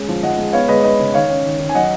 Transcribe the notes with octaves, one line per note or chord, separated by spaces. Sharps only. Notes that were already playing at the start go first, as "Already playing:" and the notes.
Already playing: G#3 C#4
F3
F3 D#5 F#5
G#3
B3 C#5 F5
G#3 B4 D#5
B3 B4 D#5
C#3
D#3 C#5 F5
C#4
D#3
D#3
G#5
F#3 D#5 F#5